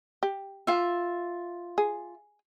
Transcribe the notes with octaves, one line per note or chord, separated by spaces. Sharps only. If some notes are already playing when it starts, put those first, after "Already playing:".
G4
F4 E5
G#4